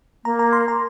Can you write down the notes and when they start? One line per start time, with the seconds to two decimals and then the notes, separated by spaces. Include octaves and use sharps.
0.24 A#3 A#5
0.39 A#5
0.53 C6
0.68 A#5